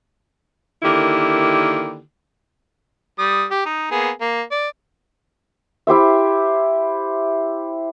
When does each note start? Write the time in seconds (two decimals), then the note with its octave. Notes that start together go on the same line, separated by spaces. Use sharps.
0.83 D3 D#3 A#3 E4 G4
3.19 G3 D#6
3.51 G4
3.66 D#4
3.91 A#3 B3 G#4
4.21 A#3
4.52 D5
5.87 E4 G4 C5 E5